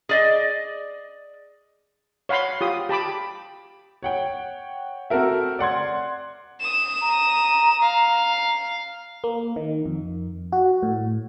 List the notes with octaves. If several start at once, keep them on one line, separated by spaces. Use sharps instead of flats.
G#4 D5 D#5
C#5 F5 F#5 B5 C6
F4 G4 D#6
G4 A5 B5 D6
C#5 F#5 G5
C4 F#4 A4 A#4 E5
D5 F#5 C6 G#6
D#6 E7
A#5
F5
A#3
D#3
F2
F#4
A2